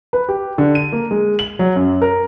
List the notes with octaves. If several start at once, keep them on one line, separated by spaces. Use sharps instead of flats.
B4
G4
D3
D#7
A#3
G#3
F#7
F#3
F#2
A#4